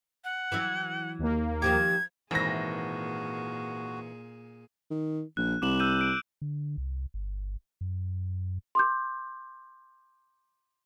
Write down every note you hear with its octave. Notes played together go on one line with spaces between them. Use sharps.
F#5
E3 F#3 E4
D#2 A#3
D#3 F3 G4 G#6
G#1 A#2 E3 F#4 G#4 A#6
D#3
A#1 F#6
C2 D6 E7 F#7
E6 G6 D#7
D7
D3
C2
G1
F#2
C6 D6 G6